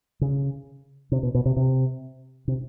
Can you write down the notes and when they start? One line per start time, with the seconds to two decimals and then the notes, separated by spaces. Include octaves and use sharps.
0.21 C#3
1.12 C3
1.23 B2
1.34 B2
1.45 C3
1.56 C3
2.48 C3